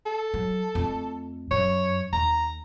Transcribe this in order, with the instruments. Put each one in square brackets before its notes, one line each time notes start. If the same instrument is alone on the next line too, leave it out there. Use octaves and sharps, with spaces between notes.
[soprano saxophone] A4
[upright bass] F#3
F2 A3
[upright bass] F#2 [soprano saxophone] C#5
[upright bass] D#2 [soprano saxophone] A#5